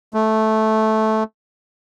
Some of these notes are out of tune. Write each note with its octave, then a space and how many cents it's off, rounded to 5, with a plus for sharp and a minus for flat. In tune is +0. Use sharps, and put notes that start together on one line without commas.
A3 -10